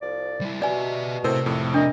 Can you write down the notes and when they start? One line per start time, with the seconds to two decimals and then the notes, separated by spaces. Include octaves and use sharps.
0.01 C2 F3 D5
0.41 G3 E4
0.62 B2 G4 D5 E5 G#5
1.24 A2 C3 A#4 C5
1.46 F2 A2
1.74 D4 A#4 D5 D#5